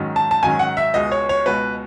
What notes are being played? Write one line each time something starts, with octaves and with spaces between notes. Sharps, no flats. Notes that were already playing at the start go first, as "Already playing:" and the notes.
Already playing: G#2 D#3 F#3 C#4
A5
A5
G#2 D#3 F#3 C#4 G#5
F#5
E5
C#2 B2 G#3 D#5
C#5
C#5
C#2 B2 G#3 B4